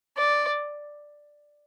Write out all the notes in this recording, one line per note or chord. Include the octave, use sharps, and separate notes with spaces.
D5